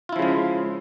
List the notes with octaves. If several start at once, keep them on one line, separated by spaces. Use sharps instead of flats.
C#3 F3 G#3 E4 F4